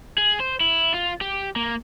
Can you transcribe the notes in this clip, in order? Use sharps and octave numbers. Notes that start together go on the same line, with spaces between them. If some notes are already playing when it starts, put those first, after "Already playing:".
G#4
C5
E4
F4
G4
A#3